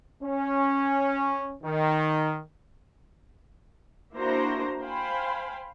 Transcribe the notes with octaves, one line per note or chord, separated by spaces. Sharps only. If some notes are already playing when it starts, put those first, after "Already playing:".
C#4
D#3
A#3 D4 E4 F#4 C5 A#5
C5 F5 G5 G#5 B5